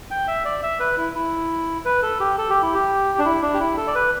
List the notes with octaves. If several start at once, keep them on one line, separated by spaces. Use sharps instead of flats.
G5
E5
D5
E5
B4
E4
E4
B4
A4
G4
A4
G4
E4
G4
D4
E4
D4
G4
E4
A4
D5
B4